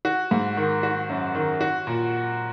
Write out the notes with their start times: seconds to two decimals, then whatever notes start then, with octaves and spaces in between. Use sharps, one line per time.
0.05 F#4
0.31 G#2
0.57 D#3
0.83 F#4
1.09 F#2
1.35 D#3
1.61 F#4
1.87 A#2